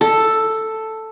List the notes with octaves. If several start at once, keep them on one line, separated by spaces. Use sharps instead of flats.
A4